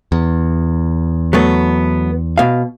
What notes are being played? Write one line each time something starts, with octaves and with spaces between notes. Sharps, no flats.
E2
F#3 A3 B3
B2 F5